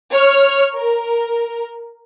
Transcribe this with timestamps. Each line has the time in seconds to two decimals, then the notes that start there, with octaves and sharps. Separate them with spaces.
0.11 C#5 F6
0.74 A#4